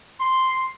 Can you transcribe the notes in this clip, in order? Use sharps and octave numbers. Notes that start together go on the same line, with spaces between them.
C6